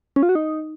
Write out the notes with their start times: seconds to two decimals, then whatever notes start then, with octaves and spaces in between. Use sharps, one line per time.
0.16 C#4
0.23 F4
0.29 F#4
0.35 D#4